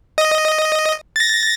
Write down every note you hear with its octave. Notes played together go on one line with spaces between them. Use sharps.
D#5
A6 A#6